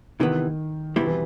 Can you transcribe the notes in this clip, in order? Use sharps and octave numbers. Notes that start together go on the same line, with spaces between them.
C3 D#3 E3 B3
E2 B2 E3 G3 C4 E4
E3